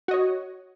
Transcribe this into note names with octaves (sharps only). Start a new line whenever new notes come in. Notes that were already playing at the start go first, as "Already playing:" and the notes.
F#4 C#5 D#5